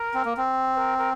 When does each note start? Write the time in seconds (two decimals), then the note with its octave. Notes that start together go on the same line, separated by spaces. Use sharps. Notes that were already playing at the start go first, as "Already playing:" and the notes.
Already playing: A#4
0.14 C4
0.25 A#3
0.37 C4
0.74 C5
0.77 A#4
0.98 A#4